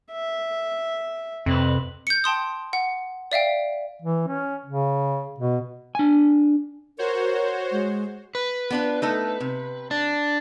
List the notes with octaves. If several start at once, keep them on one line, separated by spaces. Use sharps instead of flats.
E5
F2 C3 C4 B4
G6 C#7
G5 A5 C6 D#6
F#5
D5 E5 F5 G5
E3
C#4
C#3
B2
D4 G#5
F#4 A#4 C5 C#5
G#3
B4
B3 D4 F4
A3 D#4 A4
C3
D4